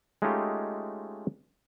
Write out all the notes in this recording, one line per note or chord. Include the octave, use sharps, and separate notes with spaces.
G#3 A3 C#4 D#4 F4 G4